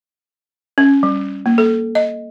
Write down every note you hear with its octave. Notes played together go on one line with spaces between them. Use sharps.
C#4
G3
A#3
A4
D#5